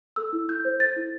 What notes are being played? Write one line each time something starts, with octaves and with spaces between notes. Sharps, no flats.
A4 E6
E4
E4 G6
C5
A4 A6
E4